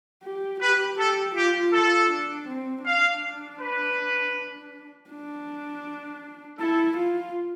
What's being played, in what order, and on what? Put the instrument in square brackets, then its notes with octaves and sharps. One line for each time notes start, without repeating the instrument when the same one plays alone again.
[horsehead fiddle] G4
[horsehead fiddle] G4 [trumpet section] B4
[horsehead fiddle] G4 [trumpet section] A4
[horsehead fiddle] F4 [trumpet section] G4
[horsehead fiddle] F4 [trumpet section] A4
[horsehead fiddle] D4
C4
[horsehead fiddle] D4 [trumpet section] F5
[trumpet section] B4
[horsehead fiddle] D4
[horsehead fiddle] E4 [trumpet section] A4
[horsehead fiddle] F4